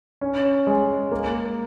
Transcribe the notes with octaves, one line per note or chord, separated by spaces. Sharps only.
C#4
G#3
A#3